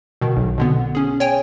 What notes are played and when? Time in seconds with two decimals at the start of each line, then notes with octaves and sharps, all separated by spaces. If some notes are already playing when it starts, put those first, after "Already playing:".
0.21 B2 D#3
0.37 B1
0.58 B2 D3 B3
0.95 C#4 G#4
1.20 C#5 G5 G#5